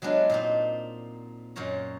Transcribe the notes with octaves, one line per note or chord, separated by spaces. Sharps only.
F#3 G#3 B3 D4 F4
A#2 C4 D#4
F#2 A#2 F4 C#5 A#5